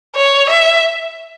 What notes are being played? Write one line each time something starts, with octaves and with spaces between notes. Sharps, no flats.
C#5
E5